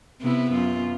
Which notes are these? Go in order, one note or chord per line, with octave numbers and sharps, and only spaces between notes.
C3 B3 E4
F#2 F4